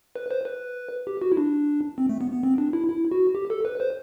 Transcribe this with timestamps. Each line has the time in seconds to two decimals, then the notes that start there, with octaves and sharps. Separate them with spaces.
0.16 B4
0.31 C5
0.45 B4
1.07 G4
1.22 F#4
1.32 E4
1.37 D4
1.98 C4
2.09 A3
2.21 B3
2.32 B3
2.44 C4
2.58 D4
2.73 E4
2.89 E4
3.11 F#4
3.35 G4
3.50 A4
3.65 B4
3.80 C5